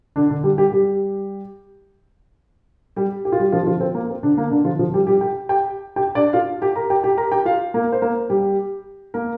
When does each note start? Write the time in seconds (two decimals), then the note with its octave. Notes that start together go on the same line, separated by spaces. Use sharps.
0.16 D3 D4
0.30 D3 D4
0.43 G3 G4
0.58 G3 G4
0.72 G3 G4
2.96 G3 G4
3.25 G4
3.32 F4
3.40 G3 G4
3.52 F3 F4
3.67 F3 F4
3.80 C4
3.95 A#3
4.09 C4
4.23 D3 D4
4.38 A#3
4.51 D3 D4
4.65 F3 F4
4.79 F3 F4
4.94 G3 G4
5.07 G3 G4
5.21 G4 G5
5.49 G4 G5
5.96 G4 G5
6.15 D4 D5
6.33 F4 F5
6.62 G4 G5
6.76 A#4 A#5
6.90 G4 G5
7.03 G4 G5
7.17 A#4 A#5
7.32 G4 G5
7.45 F4 F5
7.74 A#3 A#4
7.92 C5
8.02 A#3 A#4
8.30 G3 G4
9.14 A#3 A#4